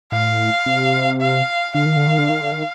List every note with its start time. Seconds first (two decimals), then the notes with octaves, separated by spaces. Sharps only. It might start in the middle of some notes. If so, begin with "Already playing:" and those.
0.12 A2 F5
0.66 C3
1.21 F5
1.75 D3 F5
1.86 D#3
1.97 D3
2.07 D#3
2.19 D3
2.30 D#3
2.41 D3
2.52 D#3